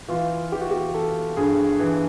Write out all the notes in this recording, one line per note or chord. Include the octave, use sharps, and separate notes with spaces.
E3 F4
E3 G4
F#4
G4
E3 A4
G2 G#4
E3